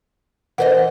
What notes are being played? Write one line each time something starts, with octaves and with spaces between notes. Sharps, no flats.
E3 A#4 C5 D#5 F#5